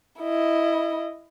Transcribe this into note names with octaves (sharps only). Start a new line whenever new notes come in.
E4 D#5